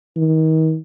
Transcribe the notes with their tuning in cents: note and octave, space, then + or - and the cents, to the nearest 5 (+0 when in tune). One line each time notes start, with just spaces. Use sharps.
D#3 +35